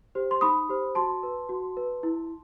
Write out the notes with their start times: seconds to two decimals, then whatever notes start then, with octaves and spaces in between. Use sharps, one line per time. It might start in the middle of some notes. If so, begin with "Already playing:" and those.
0.15 G4 C5
0.31 C6
0.41 D#4 B5 D#6
0.69 G4 C5
0.95 F#4 A5 C6
1.23 B4
1.49 F#4
1.77 B4
2.03 E4